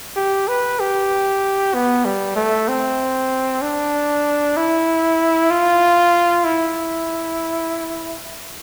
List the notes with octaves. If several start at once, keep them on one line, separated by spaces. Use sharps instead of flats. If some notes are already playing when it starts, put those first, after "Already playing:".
G4
B4
G4
B3
G3
A3
C4
D4
E4
F4
E4